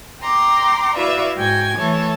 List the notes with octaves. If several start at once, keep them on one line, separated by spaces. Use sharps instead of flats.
G5 A#5 C6 D6
E4 F#4 B4 D5 E5 F5
G#2 F#4 G5 G#5 G#6
E3 A3 A4 C#5